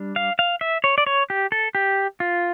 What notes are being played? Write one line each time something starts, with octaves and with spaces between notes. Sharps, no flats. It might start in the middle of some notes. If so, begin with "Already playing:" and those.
Already playing: G3 D4
F5
F5
E5
C#5
D5
C#5
G4
A4
G4
F4